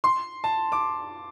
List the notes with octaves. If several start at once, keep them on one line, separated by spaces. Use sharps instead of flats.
C6
A5
D6